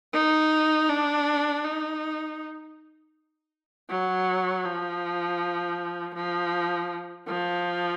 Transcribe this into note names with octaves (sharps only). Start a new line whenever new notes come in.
D#4
D4
D#4
F#3
F3
F3
F3